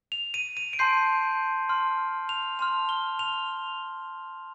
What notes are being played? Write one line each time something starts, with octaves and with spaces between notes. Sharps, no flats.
F7
D#7
D#7
D7
A5 C6 G6 C7
A5 C6 F6
F7
A5 C6 F6 F7
G7
F7